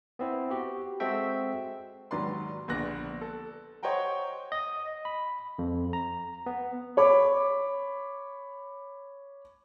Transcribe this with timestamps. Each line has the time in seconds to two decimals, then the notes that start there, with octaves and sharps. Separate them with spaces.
0.19 B3 C4 E4
0.50 F#4 G4
1.00 G#3 C4 F#4 A4 E5 G5
2.11 D#2 G#2 F#3 B4 D5 C6
2.68 A#1 D3 B3 D4 F#6 A#6
3.21 A4
3.83 C5 C#5 D#5 F#5 G5 A#5
4.52 D#5
5.05 B5
5.59 F2
5.93 A#5
6.46 B3
6.97 C#5 B5 D6